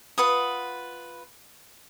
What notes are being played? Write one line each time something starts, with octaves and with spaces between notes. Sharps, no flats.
F4 B4 F#5 D#6